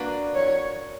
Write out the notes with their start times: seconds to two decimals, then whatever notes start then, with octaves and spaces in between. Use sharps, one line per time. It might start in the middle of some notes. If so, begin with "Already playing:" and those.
Already playing: A#3 D4 F#4 B4
0.35 C#5